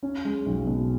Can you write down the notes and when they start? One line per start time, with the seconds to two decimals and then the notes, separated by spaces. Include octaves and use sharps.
0.03 C#4
0.25 G#3
0.46 B1
0.66 B2